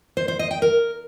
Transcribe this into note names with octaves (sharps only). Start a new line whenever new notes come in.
C5
C5
D#5
G5
A#4